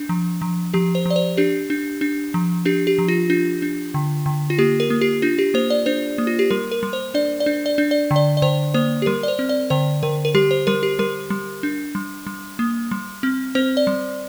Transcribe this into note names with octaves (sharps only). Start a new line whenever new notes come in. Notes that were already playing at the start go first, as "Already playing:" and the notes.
Already playing: D4
F3
F3
F3 G4
C5
F3 D5
C5
D4 G4
D4
D4
F3
D4 G4
G4
F3
F4
D4 F4
D4
D3
D3
F4
A#3 G4
A#4
A#3
G4
D4 F4
G4
A#3 C5
D5
D4 C5
A#3
F4
G4
G3 A#4
A#4
G3
C5
D4 D5
D5
D4
D5
D4
D5
D3
D5
D5
D3 C5
A#3 C5
G4
G3 A#4
D5
C5
C4
D5
D3 C5
D3 A#4
A#4
G3 G4
C5
G3 A#4
G4
G3 A#4
G3
D4
G3
G3
A#3
G3
C4
C4 C5
D5
G3